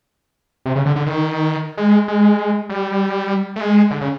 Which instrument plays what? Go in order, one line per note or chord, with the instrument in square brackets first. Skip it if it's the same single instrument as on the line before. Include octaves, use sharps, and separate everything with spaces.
[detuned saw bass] C3
C#3
D3
D3
D#3
G#3
G#3
G3
A3
G#3
D3
C#3